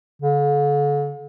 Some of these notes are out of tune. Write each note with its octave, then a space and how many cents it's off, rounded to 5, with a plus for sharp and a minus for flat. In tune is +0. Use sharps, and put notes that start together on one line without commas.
D3 -40